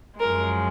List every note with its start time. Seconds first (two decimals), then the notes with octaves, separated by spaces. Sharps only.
0.20 F#2 F3 G#3 A#4